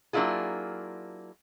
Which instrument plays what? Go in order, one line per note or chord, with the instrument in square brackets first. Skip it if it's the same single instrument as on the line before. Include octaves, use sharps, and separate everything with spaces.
[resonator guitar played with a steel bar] F#3 A#3 D4 E4 F4 G#4